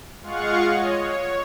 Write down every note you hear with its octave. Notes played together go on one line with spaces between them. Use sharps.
G#3 F4 F5 F#5 C#6
C#5 D#5
C#5